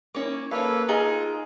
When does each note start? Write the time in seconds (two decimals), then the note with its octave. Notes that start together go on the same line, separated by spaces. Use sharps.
0.15 A#3 C#4 E4 D6
0.51 A#3 A4 B4 C#5 F5
0.88 D#4 F4 G#4 A#4